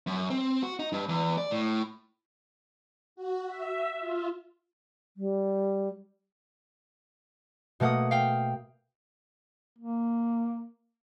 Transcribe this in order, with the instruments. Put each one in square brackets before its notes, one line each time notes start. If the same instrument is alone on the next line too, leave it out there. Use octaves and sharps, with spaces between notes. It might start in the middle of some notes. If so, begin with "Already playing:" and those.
[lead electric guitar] F#2
C4
F#4
D#4
G2
E2
D5
A2
[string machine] F#4
E5
F4
[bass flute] G3
[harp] B2 A3 A#3 F#5 D#6
F5 G5
[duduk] A#3